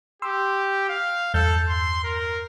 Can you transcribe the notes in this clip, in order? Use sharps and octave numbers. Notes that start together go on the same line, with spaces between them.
G4 C6 E6
F5
E2 G2 A4 G6
C6
A#4